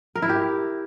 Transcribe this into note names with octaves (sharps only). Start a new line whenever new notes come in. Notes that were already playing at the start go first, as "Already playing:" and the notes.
A#4
E4
G4